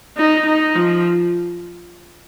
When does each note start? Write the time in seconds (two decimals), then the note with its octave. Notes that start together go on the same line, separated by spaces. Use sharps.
0.17 D#4
0.47 D#4
0.75 F3